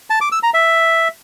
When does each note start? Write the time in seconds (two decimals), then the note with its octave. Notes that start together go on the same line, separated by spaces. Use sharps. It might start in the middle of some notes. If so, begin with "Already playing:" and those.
0.10 A5
0.21 D6
0.32 E6
0.43 A#5
0.54 E5